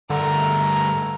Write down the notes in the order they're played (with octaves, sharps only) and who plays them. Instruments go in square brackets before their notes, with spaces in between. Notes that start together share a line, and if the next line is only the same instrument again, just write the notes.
[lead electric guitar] G2 A3 [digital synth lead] D3 [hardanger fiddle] A#4